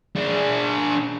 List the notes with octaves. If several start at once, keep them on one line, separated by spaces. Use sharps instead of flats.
D4 G#4